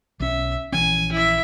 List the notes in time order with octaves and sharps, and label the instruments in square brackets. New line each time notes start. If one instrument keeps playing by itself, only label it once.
[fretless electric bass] B1 C#4 [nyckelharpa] E5
[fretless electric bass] A#1 E3 C#4 [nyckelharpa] G#5
[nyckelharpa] E4 E5